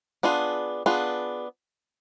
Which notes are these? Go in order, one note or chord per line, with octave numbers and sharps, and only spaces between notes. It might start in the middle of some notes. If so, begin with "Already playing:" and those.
B3 D4 F4 G#4
B3 D4 F4 G#4